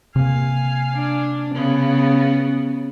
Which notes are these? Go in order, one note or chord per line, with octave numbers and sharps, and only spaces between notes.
C3 A#3 F5 G#5
D4
C#3 B3